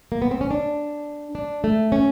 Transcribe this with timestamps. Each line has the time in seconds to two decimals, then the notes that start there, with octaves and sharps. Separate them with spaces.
0.12 A#3
0.22 B3
0.31 C4
0.41 C#4
0.51 D4
1.35 D4
1.64 A3
1.92 C#4